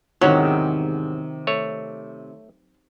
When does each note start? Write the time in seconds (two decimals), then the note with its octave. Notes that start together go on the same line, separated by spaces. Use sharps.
0.21 E2 G#2 C3 D#3 F#3 C#4
1.47 A3 C#5